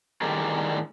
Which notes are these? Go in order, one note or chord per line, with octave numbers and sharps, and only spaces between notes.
A2 D3 D#3 G3 G#4 A#4